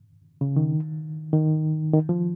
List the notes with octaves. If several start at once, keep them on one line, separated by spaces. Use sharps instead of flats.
C#3
D#3
D#3
D#3
F3